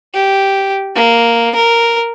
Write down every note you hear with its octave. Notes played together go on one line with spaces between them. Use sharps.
G4
A#3
A#4